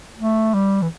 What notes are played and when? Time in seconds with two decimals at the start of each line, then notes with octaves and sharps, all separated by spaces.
0.19 A3
0.54 G3
0.82 E3